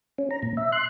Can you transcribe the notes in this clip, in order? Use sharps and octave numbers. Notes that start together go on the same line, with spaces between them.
C#4
A#5
A#2
E5
C6 F#6